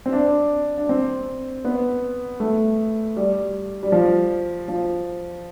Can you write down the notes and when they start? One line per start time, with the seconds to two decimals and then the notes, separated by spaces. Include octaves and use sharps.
0.06 C4
0.13 D4
0.78 D4
0.89 C4
1.65 B3
2.40 A3
3.17 G3
3.83 G3
3.92 F3
4.68 F3